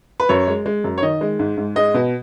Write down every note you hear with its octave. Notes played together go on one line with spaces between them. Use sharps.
B4
F#2 C#5
G#3
G#3
F#2
C#5
D#3 D#5
G#3
G#2
G#2
G#3 D#5
B2